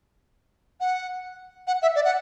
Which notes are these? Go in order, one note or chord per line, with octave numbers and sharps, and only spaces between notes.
F#5
F#5
E5
D5
F#5